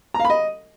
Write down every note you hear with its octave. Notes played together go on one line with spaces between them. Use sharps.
A#5
F5
B5
D#5